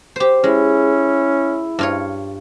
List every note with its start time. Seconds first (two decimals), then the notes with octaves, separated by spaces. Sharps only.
0.16 G4 C5
0.44 G#3 C#4 E4
1.79 G2 F4 C#5